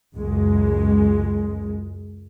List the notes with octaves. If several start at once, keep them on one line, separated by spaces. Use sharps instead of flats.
C#2 F#2 G#3